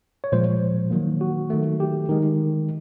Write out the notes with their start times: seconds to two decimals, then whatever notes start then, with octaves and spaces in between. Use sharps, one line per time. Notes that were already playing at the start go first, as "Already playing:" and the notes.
0.24 C#5
0.32 A#2 F3 G#3 C5
0.91 D#3 F#3 A#3
1.21 F#4
1.50 D#3 F#3 A3
1.80 G4
2.09 D#3 G#3